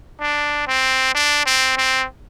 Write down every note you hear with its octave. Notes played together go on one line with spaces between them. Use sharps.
D4
C4
D4
C4
C4